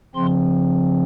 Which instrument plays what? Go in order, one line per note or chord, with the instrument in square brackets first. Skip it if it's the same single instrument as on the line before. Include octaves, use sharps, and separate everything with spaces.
[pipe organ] C#3 F3 C4 C6